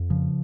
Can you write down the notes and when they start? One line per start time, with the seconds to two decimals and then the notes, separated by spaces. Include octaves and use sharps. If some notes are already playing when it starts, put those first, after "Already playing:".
Already playing: F2
0.10 C#3 F3